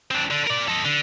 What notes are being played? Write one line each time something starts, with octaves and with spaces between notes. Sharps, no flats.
C4 D4
D3
A#4 D5
A4 D#5
D3